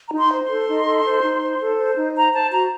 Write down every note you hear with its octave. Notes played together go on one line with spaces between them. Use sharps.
A#5
D#4
C6
C5
C6
A4
D#4
A4
C5
D#4
C5
A4
C5
D#4
C5 A#5
C5 A5
F#4 A#5